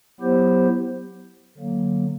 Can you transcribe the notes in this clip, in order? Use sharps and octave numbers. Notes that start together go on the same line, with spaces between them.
F#3 B3 E4 G4 C5
D3 F#3 A#3